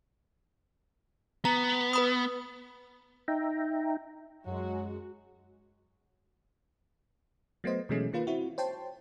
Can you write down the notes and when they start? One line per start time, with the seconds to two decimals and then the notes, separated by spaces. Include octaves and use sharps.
1.45 B3 A#5
1.93 B4 B5 D#6
3.28 D#4 E5 G5 A#5
4.46 F#2 F#3 G#3 F#4
7.64 F#3 A3 B3 C5 D#5
7.89 B2 E3 F#3 G#3 A3 C#4
8.13 D#3 A#3 F4 B4
8.27 C4 E4 F#4
8.58 C5 C#5 G5 A5 C6